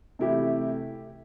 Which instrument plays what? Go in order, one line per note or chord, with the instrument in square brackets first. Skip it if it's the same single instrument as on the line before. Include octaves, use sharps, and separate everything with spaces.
[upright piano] C3 E3 A3 E4 G4